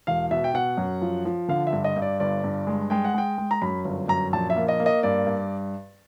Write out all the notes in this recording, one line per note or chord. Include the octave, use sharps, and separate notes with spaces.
E1 F5
B2 E5
G5
B2 F#5
F#2
F3
F3
D3 F5
E5
G2
D#5
G2
D5
G1 D5
G2
G#3
G#3 G5
F#5
G#3 G5
G#3
A#5
F#2 B5
G1
F#2 A#5
A#1 A5
E5
A#3
D#5
A#3
D#5
G2 D5
G2